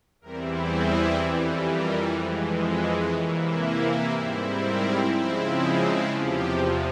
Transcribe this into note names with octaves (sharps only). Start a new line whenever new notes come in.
E2 E3 G3 C4 E4 A#4
G#4
F2 E3 G3
A#4
F2 E3 G#3
E5
C3 E3 A#3 E4 C#5
G#2 G3 C4 E4 C5
A#4
C#3 F3 G#3 C4 E4
G#4
E2 C3 F3 G4